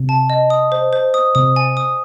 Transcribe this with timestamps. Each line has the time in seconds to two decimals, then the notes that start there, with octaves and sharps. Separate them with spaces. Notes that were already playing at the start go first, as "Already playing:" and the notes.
Already playing: C3
0.09 A5
0.30 D#5
0.50 D#6
0.72 C5
0.93 C5
1.14 D#6
1.35 C3 D#6
1.56 G#5
1.77 D#6